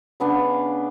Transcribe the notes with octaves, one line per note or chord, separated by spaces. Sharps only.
C#3 B3 D4 F5